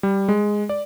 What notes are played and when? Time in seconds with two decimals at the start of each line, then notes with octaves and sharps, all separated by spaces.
0.03 G3
0.29 G#3
0.69 D5